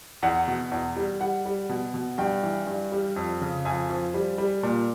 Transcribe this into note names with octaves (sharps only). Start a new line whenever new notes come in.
E2 F#5
B2
E2
G3
G3 F#5
G3
B2
B2
G2 G5
E3
G2
G3
F2
C#3
F2 G#5
F3
G3
G3
A#2